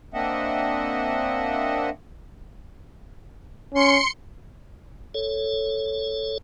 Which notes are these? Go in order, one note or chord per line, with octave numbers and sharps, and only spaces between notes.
A#3 C4 D4 D#5 E5 F#5
C#4 C6 C#7
A4 C#5